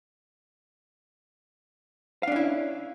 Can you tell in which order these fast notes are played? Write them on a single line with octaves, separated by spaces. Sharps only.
F5 D4 C#4 E4